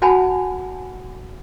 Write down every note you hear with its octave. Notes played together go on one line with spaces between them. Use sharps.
F#4 F#5 G#5 A5 B5